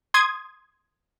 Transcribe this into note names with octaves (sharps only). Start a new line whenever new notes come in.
C6 D#6 G#6